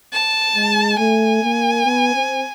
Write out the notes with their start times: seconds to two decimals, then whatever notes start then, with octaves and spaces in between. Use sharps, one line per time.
0.13 A5
0.55 G#3
0.98 A3 G#5
1.42 A#3
1.84 B3
2.14 C4